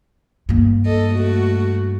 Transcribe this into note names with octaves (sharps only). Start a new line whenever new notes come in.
G2 A#3
A4 D#5
A3 F#4